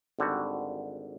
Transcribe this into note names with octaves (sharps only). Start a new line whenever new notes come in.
G#1 D3 G3 F#4